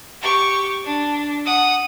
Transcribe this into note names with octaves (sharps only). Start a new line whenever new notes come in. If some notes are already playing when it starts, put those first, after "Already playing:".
G4 C#6
D4
F#5 D#6